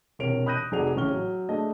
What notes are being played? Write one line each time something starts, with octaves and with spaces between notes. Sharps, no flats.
E1 C3 A#4 C#5 D7 F7
B5 D#6 F#6 G6 A#6 D#7
F1 D#4 F#4 G#4 D5 F7
A1 C#3 C#4 C#6 F6 G7
F#3
A3 D4 G#4 D#5